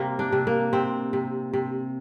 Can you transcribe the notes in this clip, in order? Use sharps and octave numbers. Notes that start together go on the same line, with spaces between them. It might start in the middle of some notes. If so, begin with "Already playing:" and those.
Already playing: C3 G3 A#3
D4
C3
A#3
C3 C4
C3
C3